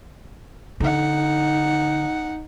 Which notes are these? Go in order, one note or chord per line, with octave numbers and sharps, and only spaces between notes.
D3 D#4 F#5